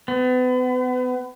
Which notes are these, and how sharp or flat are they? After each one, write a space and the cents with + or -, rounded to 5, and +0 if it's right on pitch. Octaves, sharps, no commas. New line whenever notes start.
B3 +35